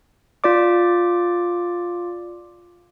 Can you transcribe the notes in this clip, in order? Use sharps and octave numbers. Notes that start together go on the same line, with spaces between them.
F4 D5 D6